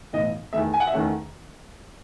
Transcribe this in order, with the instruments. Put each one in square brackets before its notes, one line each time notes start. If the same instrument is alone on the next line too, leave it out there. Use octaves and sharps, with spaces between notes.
[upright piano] B1 A2 E3 B3 D#5
E2 D#3 A3 E5
G#5
F#5
E5
E2 D#3 A3 C#4 F#5